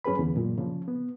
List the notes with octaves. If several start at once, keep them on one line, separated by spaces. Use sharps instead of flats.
F#2 C#4 G#4 B4 B5
E2 D3
F#2 A#2
C#3 F3
B3